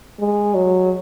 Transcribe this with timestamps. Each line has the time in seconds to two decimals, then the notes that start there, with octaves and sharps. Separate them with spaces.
0.19 G#3
0.54 F#3